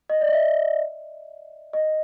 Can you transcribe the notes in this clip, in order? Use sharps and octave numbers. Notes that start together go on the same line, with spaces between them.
D#5
D5
D#5
E5
D#5